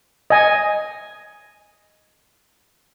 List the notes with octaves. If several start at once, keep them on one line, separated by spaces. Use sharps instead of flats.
D#5 G#5